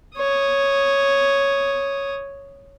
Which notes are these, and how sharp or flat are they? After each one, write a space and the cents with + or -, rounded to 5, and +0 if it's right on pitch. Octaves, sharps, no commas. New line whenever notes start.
C#5 +0 D#6 +0